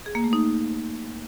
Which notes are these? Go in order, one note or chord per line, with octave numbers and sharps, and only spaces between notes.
G#4
A#3
A3
D#4